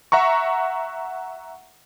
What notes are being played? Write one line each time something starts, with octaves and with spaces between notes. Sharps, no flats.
E5 F#5 A#5 C#6